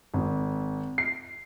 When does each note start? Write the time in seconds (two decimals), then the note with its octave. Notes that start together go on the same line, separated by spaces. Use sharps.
0.14 G#1
0.98 C7